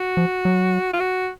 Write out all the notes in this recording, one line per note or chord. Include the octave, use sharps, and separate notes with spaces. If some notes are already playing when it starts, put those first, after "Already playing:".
Already playing: F#4
F3
F#3
F4
F#4